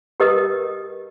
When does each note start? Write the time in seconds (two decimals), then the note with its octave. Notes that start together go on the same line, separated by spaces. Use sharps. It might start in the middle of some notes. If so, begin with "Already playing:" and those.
0.20 G4 A#4 B4 D#5 D#6